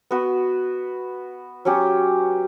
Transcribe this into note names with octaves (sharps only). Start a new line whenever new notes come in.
B3 F#4 B4
F#3 C#4 G4